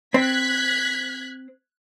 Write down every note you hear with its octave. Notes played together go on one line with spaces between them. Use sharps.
C4 F#6 G#6 B6